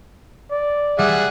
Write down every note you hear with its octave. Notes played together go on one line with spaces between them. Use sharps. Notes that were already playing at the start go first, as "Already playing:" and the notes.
D5
G3 G#4 E5 F#5